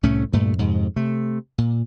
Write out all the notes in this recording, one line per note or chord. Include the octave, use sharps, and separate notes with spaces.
C2 A2 A3 C#4
D2 G2 A#2 A3
F2 G#2 C3
C3 A3
A#2